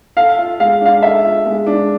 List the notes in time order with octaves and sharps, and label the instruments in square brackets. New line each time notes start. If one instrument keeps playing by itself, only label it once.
[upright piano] A4 [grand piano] F5
[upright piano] F4
[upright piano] G#3 [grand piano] F5
[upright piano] D4 [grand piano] F5
[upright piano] A4 [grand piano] E5
[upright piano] F4
G#3
D4